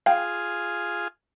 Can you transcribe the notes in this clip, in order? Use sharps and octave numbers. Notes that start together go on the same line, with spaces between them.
F4 G#4 F5 G5